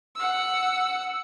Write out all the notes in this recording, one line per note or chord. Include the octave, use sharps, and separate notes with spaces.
F#5 E6